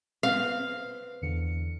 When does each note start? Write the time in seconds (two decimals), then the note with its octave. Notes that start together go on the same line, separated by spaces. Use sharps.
0.23 B3 C4 F5
1.22 E2 D3 C#7